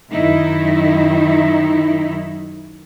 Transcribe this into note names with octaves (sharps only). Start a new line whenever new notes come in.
F#2 D#3 D#4 E4